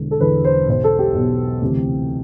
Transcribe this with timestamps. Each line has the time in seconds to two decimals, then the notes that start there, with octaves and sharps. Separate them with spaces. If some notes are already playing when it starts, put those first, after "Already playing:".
Already playing: E1 E2 D3
0.11 A4
0.21 E1 E2 D3 B4
0.44 C5
0.67 B1 B2 C5
0.84 A4
0.99 G4
1.14 B1 B2
1.62 D2 C3 E3